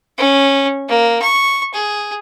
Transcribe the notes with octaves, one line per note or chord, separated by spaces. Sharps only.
C#4
A#3
C#6
G#4